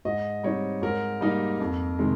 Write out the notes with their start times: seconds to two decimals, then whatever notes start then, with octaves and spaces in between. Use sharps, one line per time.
0.05 G#2 D#5
0.43 G3 C4 D#4 C#5
0.82 G#2 A#4
1.21 G3 A#3 D#4
1.60 F2
1.99 C3 D#3 G#3